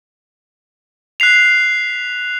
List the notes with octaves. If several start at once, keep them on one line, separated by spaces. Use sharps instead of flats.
F#6 B6 C7 F7